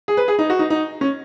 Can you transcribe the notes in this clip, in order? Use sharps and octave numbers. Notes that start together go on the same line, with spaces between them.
G#4
B4
G#4
D#4
F#4
D#4
D#4
C#4